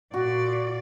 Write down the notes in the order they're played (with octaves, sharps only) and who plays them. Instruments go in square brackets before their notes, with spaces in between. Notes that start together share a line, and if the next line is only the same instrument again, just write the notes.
[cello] A#2 D5 [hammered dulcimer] F#4